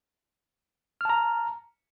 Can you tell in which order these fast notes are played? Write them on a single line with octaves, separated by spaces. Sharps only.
F6 A5 A#5